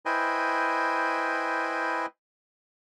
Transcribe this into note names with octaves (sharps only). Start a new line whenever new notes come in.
E4 B4 C5 D#5 G5 G#5